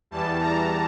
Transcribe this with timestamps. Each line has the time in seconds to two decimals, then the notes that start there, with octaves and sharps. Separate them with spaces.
0.11 E2 E3 G3 A5
0.40 A#5